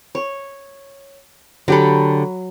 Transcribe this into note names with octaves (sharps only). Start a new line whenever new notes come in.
C#5
D3 F#3 G4 A4 B5